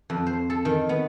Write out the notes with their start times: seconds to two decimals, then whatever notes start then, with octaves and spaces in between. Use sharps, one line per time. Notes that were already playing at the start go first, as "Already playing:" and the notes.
0.10 F2
0.27 C5
0.50 A4
0.65 D#3
0.89 B3